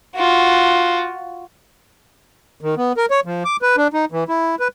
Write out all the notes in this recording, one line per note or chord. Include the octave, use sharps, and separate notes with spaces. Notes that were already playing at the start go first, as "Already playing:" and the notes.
F4 F#4
D#3
B3
A#4
C#5
F3
D6
B4
D4
D#4
E3
E4
B4